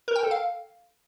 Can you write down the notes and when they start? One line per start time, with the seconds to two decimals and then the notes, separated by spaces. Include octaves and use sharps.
0.08 A#4
0.16 G5
0.23 A4
0.31 F5